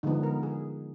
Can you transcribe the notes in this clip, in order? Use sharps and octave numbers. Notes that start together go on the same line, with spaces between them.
D3 F3 G#3 B3 D#4
A#4
G#4